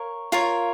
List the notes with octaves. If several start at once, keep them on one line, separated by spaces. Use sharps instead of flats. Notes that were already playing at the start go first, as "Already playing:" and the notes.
Already playing: A#4 C#5 F5
F4 A#4 C#5